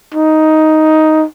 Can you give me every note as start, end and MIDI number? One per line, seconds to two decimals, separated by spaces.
0.15 1.25 63